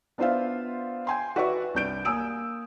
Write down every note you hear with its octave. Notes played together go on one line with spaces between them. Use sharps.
B3 D4 F4 C5 E5 F5
G5 G#5 C6
F#4 B4 D5 E5 F#5 C#6
C2 D4 G6 D7
A#3 G#5 D#6 E6 D7